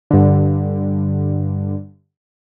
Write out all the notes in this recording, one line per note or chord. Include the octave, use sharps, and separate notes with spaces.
G2 D3